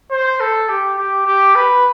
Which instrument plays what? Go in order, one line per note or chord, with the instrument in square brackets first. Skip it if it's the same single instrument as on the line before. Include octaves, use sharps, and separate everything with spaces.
[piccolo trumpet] C5
A4
G4
G4
G4
B4